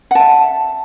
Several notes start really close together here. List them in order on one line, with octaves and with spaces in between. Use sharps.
F#5 A5 E5